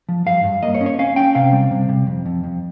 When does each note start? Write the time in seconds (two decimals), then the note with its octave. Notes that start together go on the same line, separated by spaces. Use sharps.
0.09 F3
0.26 G2 F5
0.44 G2
0.63 A#3 D#5
0.75 C#5
0.81 C#4
0.86 C#5
0.99 C#4 F5
1.16 C#4 G5
1.35 C3 F5
1.53 G3
1.71 C3
1.89 C3
2.07 F2
2.26 F2
2.44 F2